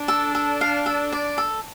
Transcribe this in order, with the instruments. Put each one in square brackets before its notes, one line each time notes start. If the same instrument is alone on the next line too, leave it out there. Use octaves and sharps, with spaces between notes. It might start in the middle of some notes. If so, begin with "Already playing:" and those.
Already playing: [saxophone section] D4
[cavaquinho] A4
A4
F5
A4
D5
A4